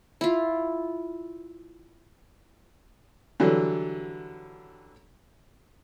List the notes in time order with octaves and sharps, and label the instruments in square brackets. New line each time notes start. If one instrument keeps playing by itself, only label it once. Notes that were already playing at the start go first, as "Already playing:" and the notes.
[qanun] E4 F4
[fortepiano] D3 E3 F#3 G3